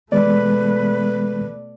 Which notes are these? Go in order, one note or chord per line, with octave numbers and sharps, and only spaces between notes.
B2 E3 G#3 A3 B3 B4 D5